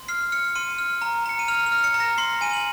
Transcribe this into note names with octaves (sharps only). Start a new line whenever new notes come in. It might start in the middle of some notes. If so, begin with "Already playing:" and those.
Already playing: C6
F6 C7
F6 C#7
C6 D#7
F6
A#5
A#5 C#7
D#7
F6 F7
F7
F6
C#7
A#5
A#6
C6 C7
G#5 D#7
F#7